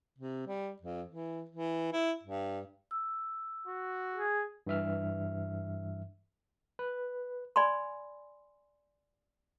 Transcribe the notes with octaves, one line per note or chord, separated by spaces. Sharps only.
C3
G3
F2
E3
E3
E4
G2
E6
F#4
G#4
G2 E3 E5 F6
B4
D5 G#5 B5 C6